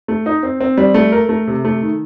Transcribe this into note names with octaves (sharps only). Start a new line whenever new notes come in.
A3
D#4
C4
C4
G3
A3
A#4
A3
C3
A3
D#3